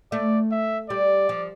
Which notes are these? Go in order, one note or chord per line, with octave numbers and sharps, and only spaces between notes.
A3 D5
E5
G3 D5
F3